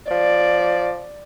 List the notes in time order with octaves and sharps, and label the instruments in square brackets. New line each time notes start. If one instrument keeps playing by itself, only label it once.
[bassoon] F3 [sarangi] D5